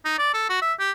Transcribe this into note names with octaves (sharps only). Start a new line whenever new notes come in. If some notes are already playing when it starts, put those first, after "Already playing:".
D#4
D5
A4
F#4
E5
G4